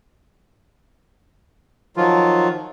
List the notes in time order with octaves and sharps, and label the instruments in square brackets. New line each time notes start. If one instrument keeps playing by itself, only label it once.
[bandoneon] D#3 F3 F#3 F4